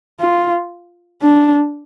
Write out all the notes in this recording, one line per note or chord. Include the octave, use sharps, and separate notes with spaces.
F4
D4